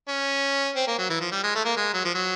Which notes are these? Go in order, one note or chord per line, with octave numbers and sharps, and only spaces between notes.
C#4
C4
A#3
F#3
E3
F3
G3
G#3
A3
A#3
G#3
F#3
F3
F#3